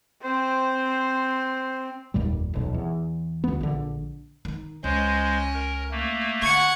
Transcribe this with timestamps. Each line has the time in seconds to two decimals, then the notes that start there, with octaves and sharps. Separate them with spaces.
0.24 C4 C5
2.14 F1 D#2 A#2 G3
2.54 D#1 B1
2.74 E2
3.44 D2 B3
3.61 A#1 D3
4.45 D#3 D#4
4.84 C#2 G#3 C#4 C5
5.54 A#4
5.91 A3 A#3
6.42 D3 F#5 C#6 G#6 C#7